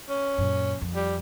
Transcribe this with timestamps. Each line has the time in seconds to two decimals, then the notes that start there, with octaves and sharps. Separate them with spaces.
0.09 C#4
0.38 F#2 A#2
0.81 F2
0.95 G3